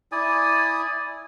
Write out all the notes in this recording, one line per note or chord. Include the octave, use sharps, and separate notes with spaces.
E4 D5 G#5 D#6